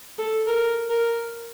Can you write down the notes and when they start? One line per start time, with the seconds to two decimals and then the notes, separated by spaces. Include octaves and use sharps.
0.18 A4
0.47 A#4
0.89 A#4